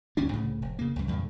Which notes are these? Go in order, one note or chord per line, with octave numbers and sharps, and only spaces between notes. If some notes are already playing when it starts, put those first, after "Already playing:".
G1 D#2 C#4 D4
C2 A2 C#3
F1
C#3 A#3
C#2 F#2
E2 G2 A#2 D3